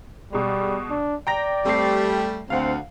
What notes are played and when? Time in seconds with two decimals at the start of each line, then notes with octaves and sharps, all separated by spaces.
0.33 B2 G3 G#3
0.90 D4
1.27 D5 G5 A#5 A#6
1.65 G3 A3 C4 G4 C7
2.50 D2 C4 F5 F#5